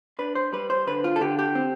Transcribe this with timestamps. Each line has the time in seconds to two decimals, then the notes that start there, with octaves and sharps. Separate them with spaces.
0.19 D4 B4
0.35 C5
0.53 G3 B4
0.70 C5
0.87 D3 B4
1.04 F4
1.16 A4
1.21 D3 G4
1.39 G4
1.55 C4